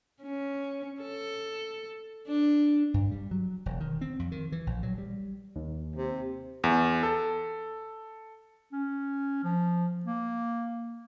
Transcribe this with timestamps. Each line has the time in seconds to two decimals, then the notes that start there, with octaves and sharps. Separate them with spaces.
0.23 C#4
1.02 A4
2.28 D4
2.94 G2
3.11 G3
3.31 F#3
3.66 E1
3.80 D#3
4.01 C4
4.19 F2
4.32 D#3
4.52 E3
4.67 A#1
4.83 F#3
4.98 G3
5.56 D#2
5.96 C3
6.64 E2
7.03 A4
8.72 C#4
9.44 F3
10.05 A#3